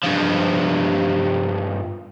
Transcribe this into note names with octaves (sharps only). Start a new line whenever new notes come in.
G2 F3